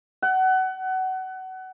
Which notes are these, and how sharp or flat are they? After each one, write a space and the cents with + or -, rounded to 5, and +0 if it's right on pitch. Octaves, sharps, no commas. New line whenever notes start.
F#5 +25